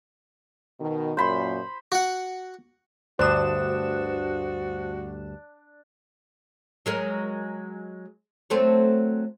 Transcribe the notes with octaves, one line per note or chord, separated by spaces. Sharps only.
B2 D#3
F#2 A#2 C5 B5 C6
F#4 F#5
D2 G2 D4 F#4 C5 D#6 E7
F#3 G#3 A#4
F#3 A3 C4